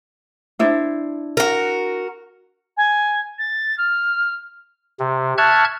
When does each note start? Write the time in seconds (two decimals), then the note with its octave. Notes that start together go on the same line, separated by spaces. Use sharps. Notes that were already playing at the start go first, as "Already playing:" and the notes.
0.59 D4 E4 C5
1.37 F#4 A#4
2.77 G#5
3.38 A6
3.78 F6
4.99 C3
5.38 E5 A5 C#6 F6 F#6 G#6